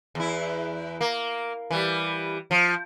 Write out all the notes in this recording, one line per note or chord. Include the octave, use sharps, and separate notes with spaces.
E2 E4
A#3
E3 G3
F3